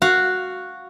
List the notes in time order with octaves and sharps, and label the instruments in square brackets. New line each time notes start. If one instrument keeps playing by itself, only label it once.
[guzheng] F#4 F5